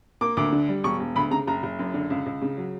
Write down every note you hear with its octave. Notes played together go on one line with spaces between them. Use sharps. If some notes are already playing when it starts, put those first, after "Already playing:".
A#3 D6
D2 D6
D3
G3
E1 C#6
E1
D2 B5
C#3 A#5
F#1 A#5
F#1
F#2
D3
C#2
C#2
C#3
F#3